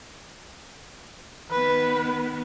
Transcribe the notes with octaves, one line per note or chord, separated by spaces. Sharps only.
D#3 B3 B4